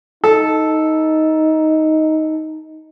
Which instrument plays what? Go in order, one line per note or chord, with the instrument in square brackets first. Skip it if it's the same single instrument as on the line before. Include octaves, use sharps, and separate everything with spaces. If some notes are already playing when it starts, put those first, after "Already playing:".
[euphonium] D#4 [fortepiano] A4